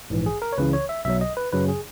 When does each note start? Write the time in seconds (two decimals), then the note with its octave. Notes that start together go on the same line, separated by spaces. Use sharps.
0.10 A#1 G#2 E3
0.26 G#4
0.42 A#4
0.52 C#5
0.58 C#2 C#3 E3 B4
0.73 C#5
0.89 E5
1.05 B1 B2 F#3 E5
1.21 D#5
1.37 B4
1.53 F#2 C#3 F#3 B4
1.68 G#4